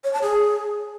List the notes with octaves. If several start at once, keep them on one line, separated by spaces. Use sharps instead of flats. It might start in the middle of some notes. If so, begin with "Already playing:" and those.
C#5
A5
G#4